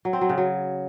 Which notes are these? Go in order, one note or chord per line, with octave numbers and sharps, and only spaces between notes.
F#3
C4
F#3
C#3
F#3